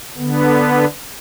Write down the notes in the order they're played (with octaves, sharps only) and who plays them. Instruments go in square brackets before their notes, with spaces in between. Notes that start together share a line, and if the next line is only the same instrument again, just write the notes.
[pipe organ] D3 B3